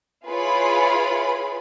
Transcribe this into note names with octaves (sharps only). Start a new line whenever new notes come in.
E4 F4 G#4 B4 C#5 B5